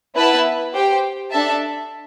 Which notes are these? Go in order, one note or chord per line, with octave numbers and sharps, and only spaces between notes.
B3 E4 B4 E5 A5
G4 C5 G5
D4 A4 E5 A5